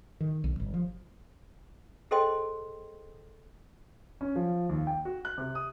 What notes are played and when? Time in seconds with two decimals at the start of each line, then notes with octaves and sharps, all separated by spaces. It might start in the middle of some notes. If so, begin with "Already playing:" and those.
0.20 D#3
0.44 B1
0.60 G1
0.74 F3
2.11 G#4 A4 C5 D#5 G5 C6
4.21 C#4
4.36 F3
4.69 D#2
4.87 G5
5.05 F#4
5.25 F#6
5.38 C3
5.55 D#6